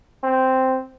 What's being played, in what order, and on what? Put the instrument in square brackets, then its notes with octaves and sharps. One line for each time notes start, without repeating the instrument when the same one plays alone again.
[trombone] C4